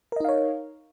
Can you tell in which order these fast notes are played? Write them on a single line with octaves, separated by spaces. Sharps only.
A#4 D#5 D#4 F5 C#5